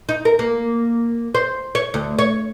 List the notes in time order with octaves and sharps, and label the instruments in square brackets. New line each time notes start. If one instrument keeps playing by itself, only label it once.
[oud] D#4
A#4
A#3
C5
C#5
D2
C#5